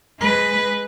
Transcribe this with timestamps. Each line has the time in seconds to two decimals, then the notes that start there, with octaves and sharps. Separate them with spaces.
0.20 G#3 B4